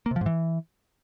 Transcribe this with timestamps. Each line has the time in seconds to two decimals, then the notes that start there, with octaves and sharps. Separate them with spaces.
0.06 A#3
0.11 C3
0.16 F3
0.21 G#2
0.26 E3